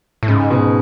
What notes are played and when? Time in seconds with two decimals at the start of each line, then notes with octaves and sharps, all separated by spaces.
0.23 A2
0.28 G#2 C#3
0.51 B2